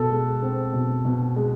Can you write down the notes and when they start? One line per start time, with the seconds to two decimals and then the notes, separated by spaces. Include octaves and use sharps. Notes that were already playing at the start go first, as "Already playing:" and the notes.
Already playing: B2 A4
0.11 G#3
0.42 C4
0.73 B2
1.05 B2
1.36 G#3